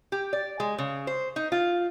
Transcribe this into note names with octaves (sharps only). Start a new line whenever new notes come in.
G4
D5
G#3
C#3
C5
D#4
F4